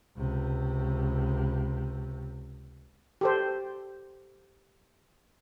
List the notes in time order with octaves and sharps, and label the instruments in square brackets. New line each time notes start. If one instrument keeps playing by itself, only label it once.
[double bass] C#2 C3
[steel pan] G4 A4 C5